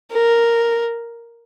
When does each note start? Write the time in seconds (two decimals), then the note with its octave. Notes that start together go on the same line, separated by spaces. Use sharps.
0.12 A#4